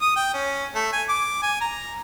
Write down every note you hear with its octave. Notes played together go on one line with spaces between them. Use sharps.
D#6
G5
C#4
A3
G#5
D6
G#5
A#5